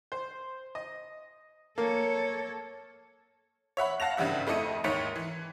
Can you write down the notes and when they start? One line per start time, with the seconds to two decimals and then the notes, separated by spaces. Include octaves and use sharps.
0.12 C5
0.75 D#5
1.78 A#3 A4 C#5
3.77 C#5 E5 F#5 B5
4.00 F5 F#5 A5 A#6 F7
4.17 G#1 G2 C#3 G3 E5 F#5
4.47 F2 A3 E4 D#5 C#7 D#7
4.84 D#2 G#2 C#5 B6 C#7
5.16 E3